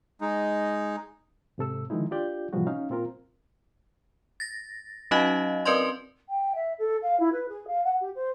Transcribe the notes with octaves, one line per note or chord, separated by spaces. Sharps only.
G#3 D#4
G#2 C3 A4 E6
D3 D#3 F3 G#3 D#4 E4
D4 F4 G4 D5 G6
A2 C3 E3 F3 G3 F#4
C#4 D#4 F5
A#2 C4 F4 A#4
A6 A#6
F#3 C#4 D#4 F#4 D#5 F5
C4 A#4 B4 D5 D#5 C6
G5
E5
A4
F5
E4
B4
G#4
F5
F#5
G4
C5